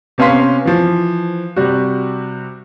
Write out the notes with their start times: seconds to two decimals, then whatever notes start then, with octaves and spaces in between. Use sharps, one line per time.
0.18 C3 B3 C#4 F5 C6 B6
0.65 E3 F3
1.56 C3 G3 F#4